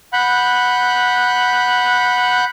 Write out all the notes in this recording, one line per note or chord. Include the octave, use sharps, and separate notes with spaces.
F#5 B5 F#6 G6